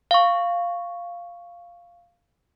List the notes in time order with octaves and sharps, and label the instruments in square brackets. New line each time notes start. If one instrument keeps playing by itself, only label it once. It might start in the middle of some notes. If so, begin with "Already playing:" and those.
[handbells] F5 C#6